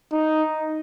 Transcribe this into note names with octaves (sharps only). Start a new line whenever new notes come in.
D#4